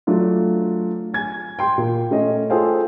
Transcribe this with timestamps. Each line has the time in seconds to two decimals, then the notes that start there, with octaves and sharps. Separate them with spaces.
0.07 F#3 A3 D4 F4
1.14 G#5 G#6
1.59 G5 C6
1.78 A#2
2.11 A3 C#4 D#5
2.50 F4 G#4 A4 C5 F5 G5